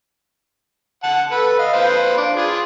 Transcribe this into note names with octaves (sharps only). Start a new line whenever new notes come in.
F#5 A5
A4 B4
D#5 F5
B4 C5 F5
D4
F4 G#4